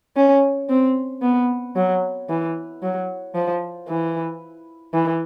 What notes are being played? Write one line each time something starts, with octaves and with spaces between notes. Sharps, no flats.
C#4
C4
B3
F#3
E3
F#3
F3
E3
E3